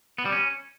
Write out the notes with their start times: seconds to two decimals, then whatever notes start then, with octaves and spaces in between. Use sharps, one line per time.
0.18 B3
0.25 G3
0.32 C#4